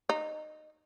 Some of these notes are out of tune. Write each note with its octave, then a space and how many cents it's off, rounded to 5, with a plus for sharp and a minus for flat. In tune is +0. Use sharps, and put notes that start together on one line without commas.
D#4 -15